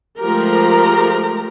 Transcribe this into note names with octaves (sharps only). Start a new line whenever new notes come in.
F3 G#3 A3 G4 A#4 A#5